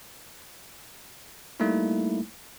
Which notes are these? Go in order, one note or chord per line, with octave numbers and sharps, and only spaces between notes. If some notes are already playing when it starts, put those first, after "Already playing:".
G3 A3 A#3 D#4 E4